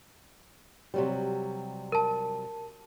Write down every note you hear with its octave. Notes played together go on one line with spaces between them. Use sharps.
C3 F#3 G3
A#4 A5